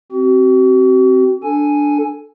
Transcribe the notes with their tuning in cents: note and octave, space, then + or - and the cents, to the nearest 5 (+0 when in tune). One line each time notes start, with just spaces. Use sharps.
C4 +0 F#4 +40
D4 +0 A4 +0 G#5 +0